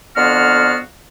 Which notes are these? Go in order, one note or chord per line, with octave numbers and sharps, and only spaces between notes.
F2 D3 B3 F#4 F5 F6